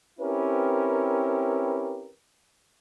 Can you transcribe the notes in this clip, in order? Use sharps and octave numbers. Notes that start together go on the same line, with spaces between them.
C4 C#4 E4 G4 A#4 B4